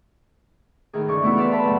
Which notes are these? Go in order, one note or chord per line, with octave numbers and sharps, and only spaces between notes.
A2 D#3 G#4
G2 C#3 D5 C#6
E3 A3 B3 E4 F#4
B4 C5 D5 E5 F5
B4 E5 A5 B5 C6
F#2 A2 C#3 F#3